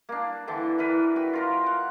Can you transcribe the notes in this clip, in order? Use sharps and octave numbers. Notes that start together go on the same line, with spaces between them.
A#3 D4
D3 E3 G5 A5
E3 A#4 B4
F#4 G5
F4 A#4 C5
F#5